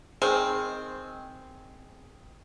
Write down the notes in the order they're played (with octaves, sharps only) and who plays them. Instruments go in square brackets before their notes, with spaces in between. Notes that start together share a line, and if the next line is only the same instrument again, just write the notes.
[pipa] D#3 G#3 C4 [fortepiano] G#4